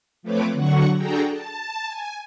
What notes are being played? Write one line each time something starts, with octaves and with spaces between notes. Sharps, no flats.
F3 A3 C4 B4 C#5 D6
D3 F#3 F#5 C#6
D4 F#4 G#4 A4 G5 A#5
A5
G#5